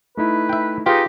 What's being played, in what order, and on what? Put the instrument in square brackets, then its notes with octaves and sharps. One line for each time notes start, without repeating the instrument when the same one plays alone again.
[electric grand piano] A3 D#4 E4 [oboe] B4
[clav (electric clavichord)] E5 G5
[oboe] D#4 [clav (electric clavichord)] F4 [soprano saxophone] G4 [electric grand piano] G#4 B4